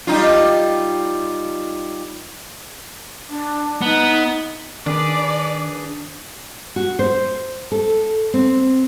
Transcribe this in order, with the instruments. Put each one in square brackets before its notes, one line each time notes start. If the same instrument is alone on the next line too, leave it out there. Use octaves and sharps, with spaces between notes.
[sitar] G3 D#4 F4
[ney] D4
[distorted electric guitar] B3 [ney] D#4
[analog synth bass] D#3 [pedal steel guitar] D4 G#4 B4 [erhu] D5
[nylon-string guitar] F#4
C5
A4
C4